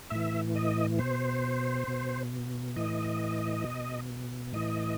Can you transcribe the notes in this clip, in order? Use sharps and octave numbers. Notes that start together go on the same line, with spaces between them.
A2 E3 E5
D#5
B2 C5
B2
A2 E3 D#5
B2
A2 E3 D#5